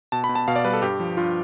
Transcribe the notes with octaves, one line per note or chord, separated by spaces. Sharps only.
B2 A5
B5
B2
A5
B2 F5
D5
G3 B4
A4
G2 G4
F3
G2 F4